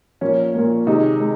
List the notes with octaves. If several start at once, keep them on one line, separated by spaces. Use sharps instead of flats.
A#2 F3 A#3 C#4
A#2 F3 A#3
C3 D#3 G#3 D#4
G#3